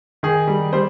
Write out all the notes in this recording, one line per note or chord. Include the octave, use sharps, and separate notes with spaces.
D#3 G#4
G3
G3 C5